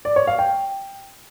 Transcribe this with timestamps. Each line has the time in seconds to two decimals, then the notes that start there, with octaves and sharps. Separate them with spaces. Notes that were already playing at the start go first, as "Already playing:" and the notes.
0.05 D5
0.16 C#5
0.27 F5
0.39 G5